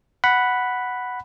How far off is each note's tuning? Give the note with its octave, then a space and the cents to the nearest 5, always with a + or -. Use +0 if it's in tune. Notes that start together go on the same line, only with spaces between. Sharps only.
F#5 +0 B5 +0